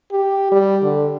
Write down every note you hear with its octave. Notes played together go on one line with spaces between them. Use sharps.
G4
G3
D3